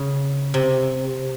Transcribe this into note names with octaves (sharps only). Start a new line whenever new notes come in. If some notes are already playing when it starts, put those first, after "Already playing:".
Already playing: C#3
C3